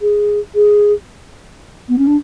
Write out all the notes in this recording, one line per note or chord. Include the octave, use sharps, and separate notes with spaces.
G#4
G#4
B3
C#4
D4